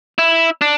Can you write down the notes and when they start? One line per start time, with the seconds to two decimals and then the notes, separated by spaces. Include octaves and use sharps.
0.18 E4
0.61 D4